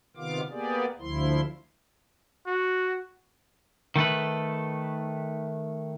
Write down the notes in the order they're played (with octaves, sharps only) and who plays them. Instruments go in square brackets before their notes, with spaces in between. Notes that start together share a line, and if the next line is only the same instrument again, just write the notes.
[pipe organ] C3 D#3 B3 F4 F5 D6
A#3 B3 G4 G#4 D5
D2 F3 E4 C6
[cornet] F#4
[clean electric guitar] D#3 A3 A4 B4